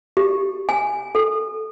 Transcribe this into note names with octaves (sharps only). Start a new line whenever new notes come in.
G4
G#5
A4